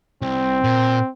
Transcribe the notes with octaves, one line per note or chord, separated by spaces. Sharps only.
C2 C4
A#2